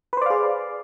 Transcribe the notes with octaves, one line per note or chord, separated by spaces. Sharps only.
G#4 B4 C5 D5 F5